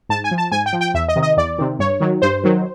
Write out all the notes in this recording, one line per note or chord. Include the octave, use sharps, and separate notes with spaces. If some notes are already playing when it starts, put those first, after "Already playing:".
G#2 A5
G#5
F3
A5
G#2 G#5
G5
F3
G5
E2 E5
D#5
C3 D#3
D#5
E2 D5
C3 D#3
G2 C#5
D#3 F#3
G2 C5
D#3 F#3